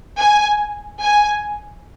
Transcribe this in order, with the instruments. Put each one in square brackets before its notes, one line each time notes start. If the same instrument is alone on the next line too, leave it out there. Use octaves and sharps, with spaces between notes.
[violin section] G#5
G#5